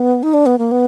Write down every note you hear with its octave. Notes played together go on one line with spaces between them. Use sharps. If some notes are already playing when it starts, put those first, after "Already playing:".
Already playing: B3
D#4
D4
B3
A#3
B3